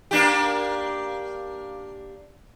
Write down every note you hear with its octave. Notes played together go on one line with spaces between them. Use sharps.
A#3 D4 G4